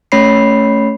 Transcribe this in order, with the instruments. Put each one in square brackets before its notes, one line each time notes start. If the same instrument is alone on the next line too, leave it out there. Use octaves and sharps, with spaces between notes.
[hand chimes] A3 C#4 C#5 B5 C7